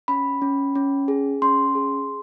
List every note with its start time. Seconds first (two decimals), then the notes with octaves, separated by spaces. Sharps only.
0.08 C#4 B5
0.42 C#4
0.75 C#4
1.08 G#4
1.42 C#4 C6
1.75 G#4